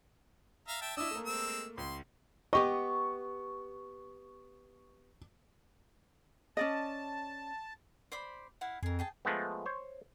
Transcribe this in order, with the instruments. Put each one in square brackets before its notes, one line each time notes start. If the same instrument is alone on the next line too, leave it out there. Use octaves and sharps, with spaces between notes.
[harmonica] E5 F5 A#5
E5 G5 A5
[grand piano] D4 E4 [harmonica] D#5 E6
[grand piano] A3 A#3
[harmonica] G#3 C4 E6
[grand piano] C#2 [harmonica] C6
[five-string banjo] B3 G4 D#5 [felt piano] C#6
[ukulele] C#4 D5 D#5 [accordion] A5
[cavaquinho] C5 D5 B5
E4 F5 F#5
[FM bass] F2 [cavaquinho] G#4 A#4
[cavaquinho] G#4 G5 A5
[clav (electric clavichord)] F3 G#3 A3 B3
C5 C#5